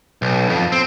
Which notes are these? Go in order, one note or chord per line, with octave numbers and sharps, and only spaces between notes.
B1
F2
C4